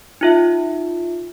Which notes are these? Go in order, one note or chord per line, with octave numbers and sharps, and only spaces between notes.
D#4 F4 E5